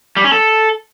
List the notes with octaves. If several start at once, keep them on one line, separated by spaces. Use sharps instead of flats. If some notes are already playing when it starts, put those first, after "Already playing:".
G3
C#4
A4